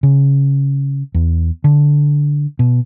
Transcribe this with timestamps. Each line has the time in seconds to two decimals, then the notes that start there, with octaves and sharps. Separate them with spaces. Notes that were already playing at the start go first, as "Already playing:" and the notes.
0.03 C#3
1.14 E2
1.64 D3
2.59 B2